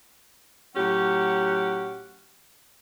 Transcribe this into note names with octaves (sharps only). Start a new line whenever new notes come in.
A2 F#3 C#4 G4 F#5